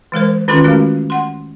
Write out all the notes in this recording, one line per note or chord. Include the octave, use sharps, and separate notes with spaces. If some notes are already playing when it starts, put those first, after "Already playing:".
E3 G#3 A#4 C5
D#3 C#4 F4 A4 C6
G#3 A3 C#4 F#4 A#4
F#5 C6